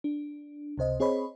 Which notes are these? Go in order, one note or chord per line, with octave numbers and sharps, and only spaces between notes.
D4
C#2 C3 C5 D#5
C4 G#4 C5 C#5 D#5 B5